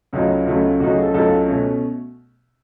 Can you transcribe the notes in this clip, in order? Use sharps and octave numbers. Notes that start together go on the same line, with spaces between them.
C#2 C#3 F#3 A3 D#4
C#2 C#3 F#3 A3 D#4
C#2 C#3 F#3 A3 D#4 F#4
G#4
A4
C#2 C#3 F#3 A3 D#4 A4
B2 A3 C#4